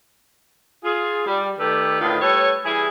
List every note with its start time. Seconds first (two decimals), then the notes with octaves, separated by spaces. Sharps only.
0.84 F4 G#4
1.26 G3
1.59 D#3 A3 G4 A4 B4 D5
2.01 A2 D3 D#3 D#4 F4 B4
2.21 G3 A3 A4 B4 C#5
2.65 E3 G3 E4 G#4